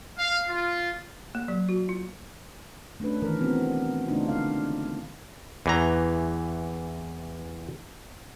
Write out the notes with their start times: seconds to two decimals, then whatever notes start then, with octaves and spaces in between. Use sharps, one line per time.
0.18 F5
0.49 F4
1.35 A#3
1.48 F#3
1.69 F#4
1.89 F4
3.00 A3 C#4 D4 B4
3.22 D#3 E3 A3 A#4
3.40 B3 C4 F#4
4.08 C#3 A3 D4 D#4 F4
4.28 D3 G#3 F5
5.66 E2 E3 A#5